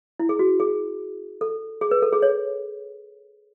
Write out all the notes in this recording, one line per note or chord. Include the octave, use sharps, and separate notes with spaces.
E4
G#4
F#4
G#4
A4
G#4
B4
A4
G#4
C#5